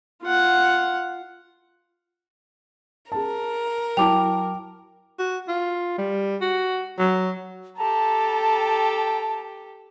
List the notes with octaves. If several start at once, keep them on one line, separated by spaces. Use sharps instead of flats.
F4 F#5
G#4 A#4 A5
F#3 E4 G5 A5 D6 F7
F#4
F4
G3
F#4
F#3
G4 A4 G5 A5 A#5